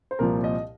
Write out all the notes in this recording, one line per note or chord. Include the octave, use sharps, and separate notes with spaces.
C5
C2 A#2 F3 A#4
D#5